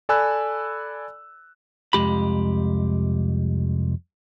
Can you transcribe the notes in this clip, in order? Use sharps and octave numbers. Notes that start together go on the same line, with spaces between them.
A4 D5 G#5 B5 E6 F#6
C2 F2 G#3 G4 B5